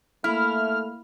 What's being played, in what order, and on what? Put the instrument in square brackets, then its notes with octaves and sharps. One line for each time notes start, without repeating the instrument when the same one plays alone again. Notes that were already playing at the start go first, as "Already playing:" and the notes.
[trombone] A3 [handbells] A#3 B5 [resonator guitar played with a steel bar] E4 [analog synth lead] F6